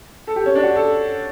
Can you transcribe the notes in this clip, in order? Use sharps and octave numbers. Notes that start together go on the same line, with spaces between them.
A4
G4
C#4
D4
F#4
A4